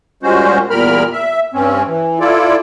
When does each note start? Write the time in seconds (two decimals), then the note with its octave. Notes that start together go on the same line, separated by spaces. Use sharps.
0.23 A#2 G3 G#3 C#4 F#4 C5
0.70 E2 A#2 G3 A#4 B5 F6
1.13 E5
1.54 G2 C4 C#4
1.87 E3
2.20 E4 F4 A4 D5